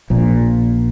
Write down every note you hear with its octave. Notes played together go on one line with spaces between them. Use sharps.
A#1 A#2